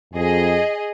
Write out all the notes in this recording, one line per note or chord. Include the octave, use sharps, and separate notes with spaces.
F2 G#4 D#5